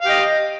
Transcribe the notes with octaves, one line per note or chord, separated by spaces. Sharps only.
G4 D#5 F5